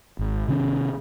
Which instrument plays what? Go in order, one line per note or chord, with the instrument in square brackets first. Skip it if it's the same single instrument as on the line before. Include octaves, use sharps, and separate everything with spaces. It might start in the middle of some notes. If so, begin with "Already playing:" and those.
[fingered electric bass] G#1
C3 D#3 C#4